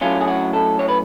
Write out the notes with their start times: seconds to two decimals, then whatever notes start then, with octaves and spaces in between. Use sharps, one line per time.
0.01 A2 F#3 A3 C#4 F4
0.21 G#4
0.28 F#4
0.53 A4
0.79 C#5
0.89 B4